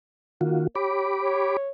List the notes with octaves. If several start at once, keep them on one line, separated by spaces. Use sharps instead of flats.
D#3 A#3 F4 F#4
G4 C#5 B5 D6
C#5